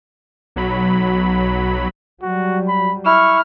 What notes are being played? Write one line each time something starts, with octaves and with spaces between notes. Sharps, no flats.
B1 F#3 B5
F#3 G3 F#4
B5
E4 C#6 F6